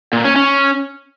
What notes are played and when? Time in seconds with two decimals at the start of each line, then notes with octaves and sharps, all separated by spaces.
0.13 A#2
0.24 C#4
0.36 C#4